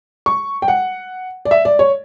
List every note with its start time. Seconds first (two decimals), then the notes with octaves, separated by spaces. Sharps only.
0.26 C#6
0.62 G5
0.68 F#5
1.45 D5
1.51 E5
1.65 D5
1.79 C#5